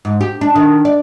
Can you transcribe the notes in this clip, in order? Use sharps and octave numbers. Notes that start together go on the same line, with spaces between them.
G#2
G4
D4
D#3
D5